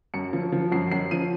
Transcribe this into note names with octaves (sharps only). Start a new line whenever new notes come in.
F#2 C#7
F3
F3
F#2 C7
F#2 C7
F3 D#7